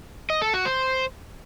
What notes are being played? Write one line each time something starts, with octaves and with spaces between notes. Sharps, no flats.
D#5
A4
F#4
C5